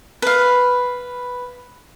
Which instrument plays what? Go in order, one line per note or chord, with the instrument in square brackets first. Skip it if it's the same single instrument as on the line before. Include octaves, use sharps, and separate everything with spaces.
[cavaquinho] B4 F5